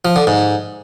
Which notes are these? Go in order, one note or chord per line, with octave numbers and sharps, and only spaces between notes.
F3
D3
G#2